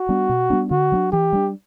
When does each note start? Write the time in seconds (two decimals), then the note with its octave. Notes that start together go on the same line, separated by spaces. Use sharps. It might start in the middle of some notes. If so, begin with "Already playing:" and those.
Already playing: F#4
0.09 G3 B3 D4
0.29 B2
0.50 G3 B3 D4
0.71 D3 F#4
0.92 F#3 B3 D4
1.12 E3 G4
1.33 G3 D4